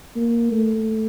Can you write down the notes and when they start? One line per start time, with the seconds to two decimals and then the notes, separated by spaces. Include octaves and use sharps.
0.16 A#3
0.51 A3